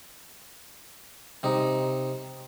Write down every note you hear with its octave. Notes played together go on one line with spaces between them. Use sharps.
C3 D#4